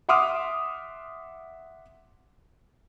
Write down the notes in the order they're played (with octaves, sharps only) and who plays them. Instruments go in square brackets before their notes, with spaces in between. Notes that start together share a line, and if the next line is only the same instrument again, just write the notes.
[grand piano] E5 F#5 C6 D6 D#6 F6